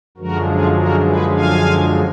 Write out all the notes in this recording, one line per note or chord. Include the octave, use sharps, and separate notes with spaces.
F#2 D3 F3 G#3 F#4 A#4
F4 G#4
F#4 A#4
G#4 B4
F5 G#5